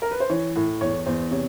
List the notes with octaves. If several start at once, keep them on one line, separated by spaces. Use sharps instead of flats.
A#4
B4
C5
E3 C#5
A2
E2 C#5
E2 C5
C3 C#5